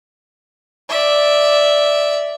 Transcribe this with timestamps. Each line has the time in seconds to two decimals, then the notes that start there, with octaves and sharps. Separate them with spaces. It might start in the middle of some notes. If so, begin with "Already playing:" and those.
0.89 D5 E5